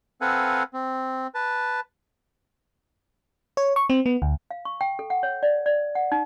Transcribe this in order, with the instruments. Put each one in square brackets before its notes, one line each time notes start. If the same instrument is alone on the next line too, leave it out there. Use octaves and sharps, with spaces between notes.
[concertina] C4 A4 B4 F5 F#5 G#5
C4
B4 A5
[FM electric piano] C#5
C#6
C4
B3
D2
[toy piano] F5
C#6
G5
A4
F#5
C#5
D5
D5
F#5
D#4